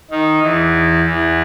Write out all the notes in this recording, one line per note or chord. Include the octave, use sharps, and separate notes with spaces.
D#3 D#4
E2 E3
E2 E3